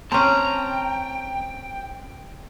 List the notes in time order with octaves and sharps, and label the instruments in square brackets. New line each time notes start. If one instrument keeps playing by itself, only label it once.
[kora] C4 C#4 [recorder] G5 [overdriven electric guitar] A5 A#5